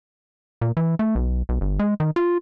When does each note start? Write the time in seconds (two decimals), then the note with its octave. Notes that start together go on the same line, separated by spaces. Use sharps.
0.62 A#2
0.77 E3
0.99 A3
1.15 B1
1.49 B1
1.61 G1
1.79 G#3
2.00 D#3
2.16 F4